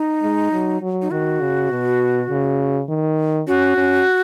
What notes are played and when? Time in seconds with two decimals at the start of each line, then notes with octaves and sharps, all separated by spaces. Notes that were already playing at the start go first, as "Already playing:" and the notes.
Already playing: D#4
0.23 G#3
0.52 F#3
0.82 F#3
1.02 D#4
1.11 D#3 F#4
1.41 C#3
1.71 B2
2.30 C#3
2.89 D#3
3.48 C#4 F#4
3.77 C#4